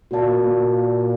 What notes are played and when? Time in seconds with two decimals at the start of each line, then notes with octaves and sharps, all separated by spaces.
0.11 A#2 F#4 A#4 D5 F5 A5
0.43 A#2